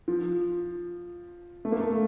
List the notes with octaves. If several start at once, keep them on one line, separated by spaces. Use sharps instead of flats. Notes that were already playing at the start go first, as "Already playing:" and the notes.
F3
A3
A#3
A3